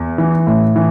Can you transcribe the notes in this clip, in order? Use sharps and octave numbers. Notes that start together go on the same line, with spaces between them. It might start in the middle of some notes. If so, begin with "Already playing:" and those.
Already playing: E2
E3
A2
E3